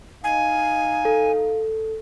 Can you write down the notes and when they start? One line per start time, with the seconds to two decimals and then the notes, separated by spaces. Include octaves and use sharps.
0.24 D#4 F5 G#5
1.05 A4